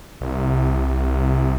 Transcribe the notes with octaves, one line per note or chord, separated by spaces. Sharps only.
C2